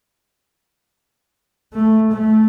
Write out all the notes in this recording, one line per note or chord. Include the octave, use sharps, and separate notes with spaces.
A3
A3